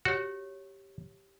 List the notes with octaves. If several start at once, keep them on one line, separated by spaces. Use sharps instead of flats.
F#4 G4 C#5